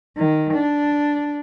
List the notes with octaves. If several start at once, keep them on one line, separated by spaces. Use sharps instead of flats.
D#3
D4